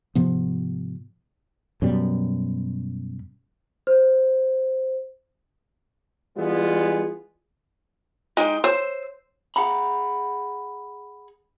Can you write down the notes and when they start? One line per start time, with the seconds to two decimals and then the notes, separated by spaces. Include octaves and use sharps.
0.15 G#2 C3 F3 B3
1.82 F#2 B2 G3
3.87 C5
6.37 E3 G3 G#3 B3 F4 G#4
8.37 G#3 D#4 G5
8.64 C5 C#5 E6
9.56 G#4 F#5 A#5 B5